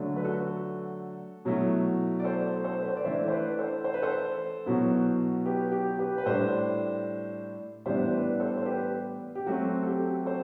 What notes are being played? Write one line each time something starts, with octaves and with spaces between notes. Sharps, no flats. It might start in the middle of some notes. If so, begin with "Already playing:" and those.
Already playing: D3 F#3 A3 D4
B4
F#4 A4
B2 F#3 A3 E4
D5
A4 C5
A4 C5
B4
C5
D5
E3 A3 D4 C5 E5
C5
B4 D5
A4 C5
C5
B4
A4 C5
B2 F#3 B3 E4
G4 B4
G4
G4 B4
B4
A2 G3 D4 A4 C5
A2 E3 G3 B3 D4 C5 E5
B4 D5
A4 C5
C5
G4 B4
G4
F#3 A3 C4 F#4
A4
G4
A4 C5